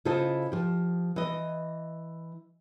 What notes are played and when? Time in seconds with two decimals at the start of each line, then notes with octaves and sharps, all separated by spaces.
0.05 C#3 E4 F4 A4 C5 D#5
0.52 F3 G4
1.16 E3 D#5